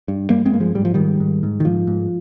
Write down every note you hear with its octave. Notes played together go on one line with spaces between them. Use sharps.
G2
G2 G3 A#3
G#3 C4
G2 A#3
F3 G#3
G#2 G3
F3
G#2 D#3 G3
G#2
G#2
D#3
G#2 F3
G#2